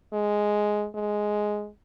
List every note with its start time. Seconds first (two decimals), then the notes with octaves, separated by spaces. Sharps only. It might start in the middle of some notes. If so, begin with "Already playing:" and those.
0.13 G#3
0.95 G#3